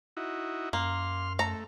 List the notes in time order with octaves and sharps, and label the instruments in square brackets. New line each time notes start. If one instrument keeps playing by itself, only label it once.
[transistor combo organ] D#4 E4 F#4
[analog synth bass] F#2 [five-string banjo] A#3 [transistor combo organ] C6 F6
[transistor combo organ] A3 [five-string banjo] A4 A#5